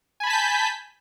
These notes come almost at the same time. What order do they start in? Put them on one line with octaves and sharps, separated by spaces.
G#5 B5 A5 B6 G6